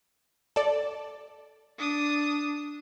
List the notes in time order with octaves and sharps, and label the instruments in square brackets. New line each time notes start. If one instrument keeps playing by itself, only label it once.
[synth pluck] A4 D5
[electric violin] D4 D#6